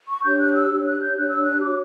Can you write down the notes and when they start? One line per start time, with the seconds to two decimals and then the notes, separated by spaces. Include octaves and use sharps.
0.08 C#6
0.23 D4 G4 C#5 G6
0.39 F#6
0.54 E6
0.69 D4 G4 C#5
0.85 F#6
1.00 G6
1.16 D4 G4 C#5 F#6
1.29 E6
1.44 F#6
1.62 F#4 C#5 D6